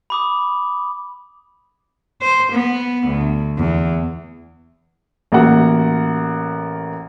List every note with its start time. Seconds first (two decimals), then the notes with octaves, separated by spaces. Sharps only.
0.10 B5 D6 D#6
2.21 C5
2.52 B3
3.07 D2
3.58 E2
5.32 A1 A#3 F#4 F#5